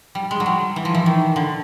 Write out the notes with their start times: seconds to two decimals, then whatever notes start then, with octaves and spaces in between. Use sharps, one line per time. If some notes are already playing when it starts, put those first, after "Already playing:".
0.15 G3
0.31 G#3
0.40 F#3
0.46 G3
0.76 E3
0.85 F3
0.95 E3
1.06 D#3
1.36 D3